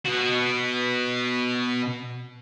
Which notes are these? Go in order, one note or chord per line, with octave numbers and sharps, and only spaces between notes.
B2 F#4